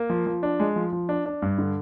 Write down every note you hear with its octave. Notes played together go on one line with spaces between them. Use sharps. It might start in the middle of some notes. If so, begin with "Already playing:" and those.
Already playing: A#3
F3
F3
D4
G#3
F3
F3
D4
D4
G2
D3